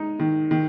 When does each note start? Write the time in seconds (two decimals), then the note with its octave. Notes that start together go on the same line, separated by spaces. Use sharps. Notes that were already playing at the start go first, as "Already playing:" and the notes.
Already playing: G#3 D#4
0.20 D#3
0.51 D#3